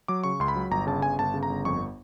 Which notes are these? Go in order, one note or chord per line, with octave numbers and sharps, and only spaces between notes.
F#3 D6
C#3 C#6
C#2 C6
B5
F#3
G1 A#5
C#3 A5
G1 G#5
G1 A5
C#3
A#5
G1
F2 C#6